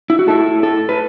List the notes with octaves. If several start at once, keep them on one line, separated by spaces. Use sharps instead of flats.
E4
F#4
A2 A3 E4 A4
A4
B4